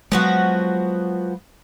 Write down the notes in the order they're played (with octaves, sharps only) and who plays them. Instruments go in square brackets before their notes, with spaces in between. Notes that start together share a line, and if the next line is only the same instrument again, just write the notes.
[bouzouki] F3 B3 F#4 [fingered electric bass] F#3 G#3